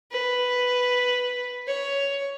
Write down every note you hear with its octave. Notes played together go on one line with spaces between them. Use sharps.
B4
C#5